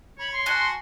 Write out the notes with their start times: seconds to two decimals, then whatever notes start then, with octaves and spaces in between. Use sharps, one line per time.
0.18 C#5 B5
0.32 C6
0.46 F#4 G#5 A5 F#6